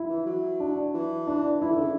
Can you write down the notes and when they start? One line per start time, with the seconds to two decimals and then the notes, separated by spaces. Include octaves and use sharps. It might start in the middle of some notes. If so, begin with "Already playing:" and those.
Already playing: E4
0.09 E3
0.26 F#3
0.60 D4
0.94 E3
1.27 D4
1.61 E3 E4
1.71 D3
1.81 C#3